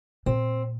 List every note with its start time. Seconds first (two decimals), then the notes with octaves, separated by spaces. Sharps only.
0.26 A#2 C4